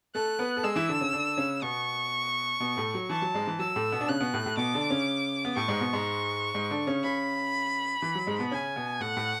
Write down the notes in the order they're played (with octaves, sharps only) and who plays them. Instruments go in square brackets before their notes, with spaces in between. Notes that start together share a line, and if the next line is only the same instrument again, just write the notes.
[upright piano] A3 A4 [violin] F#6
[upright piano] B3 B4
A4
[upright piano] G#3 G#4 [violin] E6
[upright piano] E3 E4
D3 D4
C#3 C#4
D3 D4
C#3 C#4
[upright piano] B2 B3 [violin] C#6
[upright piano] B2 B3
A2 A3
F#3
[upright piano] E3 [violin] A5
[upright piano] F#3
G#2 G#3
E3
[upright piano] F#3 [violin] E6
[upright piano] A2 A3
B2 B3
D4
[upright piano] C#3 C#4 [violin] F#6
[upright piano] B2 B3
A2 A3
A2 A3
[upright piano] B2 B3 [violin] D6
[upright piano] D3 D4
C#3 C#4
B3
[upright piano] A2 A3 [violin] C#6
[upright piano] G#2 G#3
B2 B3
G#2 G#3
G#2 G#3
D3 D4
C#3 C#4
[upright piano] C#3 C#4 [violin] B5
[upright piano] E3
F#3
G#2 G#3
B2 B3
[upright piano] C#3 C#4 [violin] G#5
[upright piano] B2 B3
[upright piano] A2 A3 [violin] F#5
[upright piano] A2 A3